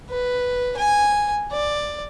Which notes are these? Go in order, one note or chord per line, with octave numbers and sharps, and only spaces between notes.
B4
G#5
D5